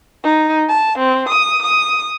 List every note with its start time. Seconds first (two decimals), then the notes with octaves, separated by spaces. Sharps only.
0.24 D#4
0.69 A5
0.98 C4
1.29 D#6
1.63 D#6